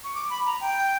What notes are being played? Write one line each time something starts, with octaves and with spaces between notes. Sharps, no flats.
C#6
D6
B5
A#5
G5